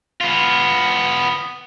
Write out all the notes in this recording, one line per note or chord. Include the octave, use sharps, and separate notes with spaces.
B3 F4